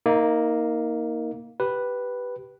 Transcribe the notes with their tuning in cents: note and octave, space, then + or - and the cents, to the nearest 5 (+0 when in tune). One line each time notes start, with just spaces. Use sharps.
A#3 +0 D#4 +25
G4 -15 B4 +0